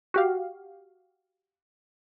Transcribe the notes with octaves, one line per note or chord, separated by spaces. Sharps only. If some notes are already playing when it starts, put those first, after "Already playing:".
F#4 G4 F5